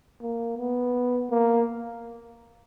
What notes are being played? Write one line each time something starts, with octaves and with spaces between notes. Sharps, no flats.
A#3
B3
A#3